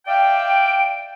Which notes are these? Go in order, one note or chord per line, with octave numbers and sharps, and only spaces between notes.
D5 E5 F5 G5